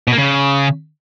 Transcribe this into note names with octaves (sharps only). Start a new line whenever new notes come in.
B2
A#3
C#3